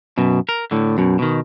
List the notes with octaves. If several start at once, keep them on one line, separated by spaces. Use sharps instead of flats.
F#2 B2
A#4
A2 D3
F#2 B2
B2 D#3